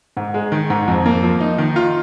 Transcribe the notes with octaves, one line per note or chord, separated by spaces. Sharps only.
G#2
G#3
D#3
G#2
F2
A#3
F3
D#4
D#3
F4